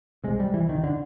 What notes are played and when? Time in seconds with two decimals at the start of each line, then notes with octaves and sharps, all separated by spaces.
0.24 C3 G#3
0.27 C2
0.40 G3
0.54 E3
0.69 D#3
0.84 D3